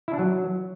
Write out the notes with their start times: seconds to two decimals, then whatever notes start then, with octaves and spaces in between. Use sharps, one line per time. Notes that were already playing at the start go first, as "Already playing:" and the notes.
0.08 E4
0.13 D4
0.19 F#3